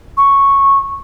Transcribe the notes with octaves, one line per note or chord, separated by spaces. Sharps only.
C#6